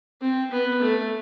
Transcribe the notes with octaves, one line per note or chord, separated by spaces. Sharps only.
C4
B3
A3